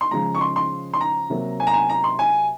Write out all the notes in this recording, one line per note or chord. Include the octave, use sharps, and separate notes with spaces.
C6
C#3 F3 G#3 A#5
C#6
C6
C6
C6
A#5
C3 F#3 A#3
G#5
A#5
G#5
A#5
C6
G#5